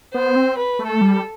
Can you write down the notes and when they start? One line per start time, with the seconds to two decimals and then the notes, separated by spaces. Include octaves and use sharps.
0.14 B3 C5
0.36 C4
0.58 B4
0.79 A3
0.87 A4
1.01 G3